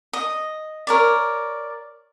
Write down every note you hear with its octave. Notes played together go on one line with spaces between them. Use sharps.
D#5
A#4 C#5 D5